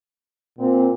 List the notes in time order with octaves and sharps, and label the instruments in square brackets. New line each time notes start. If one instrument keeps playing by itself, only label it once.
[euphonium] A#2 [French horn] C4